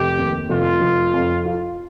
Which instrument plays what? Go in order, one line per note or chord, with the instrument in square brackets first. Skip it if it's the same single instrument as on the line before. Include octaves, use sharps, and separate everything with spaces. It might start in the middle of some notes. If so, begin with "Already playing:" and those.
Already playing: [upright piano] F1 [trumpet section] G4
[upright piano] D#2
[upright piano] F1 [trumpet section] F4
[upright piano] F1
F2
F4